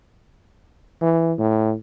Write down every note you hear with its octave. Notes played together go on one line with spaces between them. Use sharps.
E3
A2